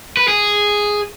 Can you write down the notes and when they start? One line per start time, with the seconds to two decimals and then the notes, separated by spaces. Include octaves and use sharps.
0.17 B4
0.28 G#4